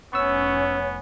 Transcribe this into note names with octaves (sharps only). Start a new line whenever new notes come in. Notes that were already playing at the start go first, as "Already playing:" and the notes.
F1 B3 C#4 C#5 C#6 E6